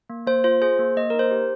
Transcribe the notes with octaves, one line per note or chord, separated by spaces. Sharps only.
A#3
A#3 C5
F4 C5
G#4 C5
A#3
A#3 D#5
D#4 A#4
C5
G4